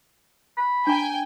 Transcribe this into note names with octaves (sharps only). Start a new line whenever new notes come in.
B5
D4 G5 G#5 A#5